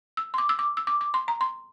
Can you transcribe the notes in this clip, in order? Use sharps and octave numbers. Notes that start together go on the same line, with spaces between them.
E6
C6
D6
E6
D6
E6
D6
D6
C6
A#5
C6